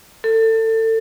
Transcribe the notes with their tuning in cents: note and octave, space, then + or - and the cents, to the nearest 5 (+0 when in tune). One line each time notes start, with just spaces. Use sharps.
A4 +25